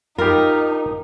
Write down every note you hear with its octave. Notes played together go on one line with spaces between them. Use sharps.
D#4 F4 G4 A#4